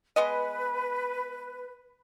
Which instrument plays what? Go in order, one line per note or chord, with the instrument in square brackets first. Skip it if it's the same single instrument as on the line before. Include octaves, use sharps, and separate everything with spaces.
[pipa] G#3 B3 D#5 [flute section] B4